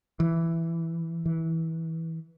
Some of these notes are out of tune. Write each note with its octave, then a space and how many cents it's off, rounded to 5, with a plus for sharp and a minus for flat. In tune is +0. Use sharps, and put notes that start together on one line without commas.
E3 +5
E3 -20